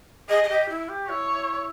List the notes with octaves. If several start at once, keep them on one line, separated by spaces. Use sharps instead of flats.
G#4 D#5
G#4
G4
E4
G4
E4 C#5